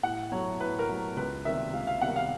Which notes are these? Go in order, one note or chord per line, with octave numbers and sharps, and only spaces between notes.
A2 F#5
F#3 A3 C#5
A2 B4
A#4
F#3 A3
C#2 B4
C3 D#3 G3 A#3 E5
C#2 F5
F5
C3 D#3 G3 A#3 F#5
F5